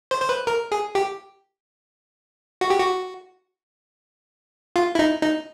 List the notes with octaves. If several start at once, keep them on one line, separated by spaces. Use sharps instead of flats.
C5
C5
B4
A#4
G#4
G4
F#4
G4
F#4
F4
E4
D#4
D#4